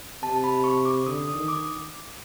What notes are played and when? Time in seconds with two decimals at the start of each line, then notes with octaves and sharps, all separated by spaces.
0.22 C3 A5
0.44 B5
0.64 C#6
0.85 D6
1.06 D3 D#6
1.28 D#6
1.34 D#3
1.48 D6